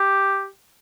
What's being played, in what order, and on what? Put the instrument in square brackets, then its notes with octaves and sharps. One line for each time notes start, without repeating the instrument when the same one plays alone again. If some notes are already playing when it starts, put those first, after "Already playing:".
Already playing: [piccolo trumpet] G4